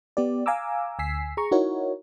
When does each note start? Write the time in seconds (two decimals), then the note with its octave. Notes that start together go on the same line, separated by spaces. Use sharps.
0.17 B3 G4 D5
0.46 F5 G#5 A#5 D6 E6
0.99 D2 G#5 E6 B6 C7
1.37 G#4 A#5 C#6
1.51 D#4 E4 F#4 A#4 C#5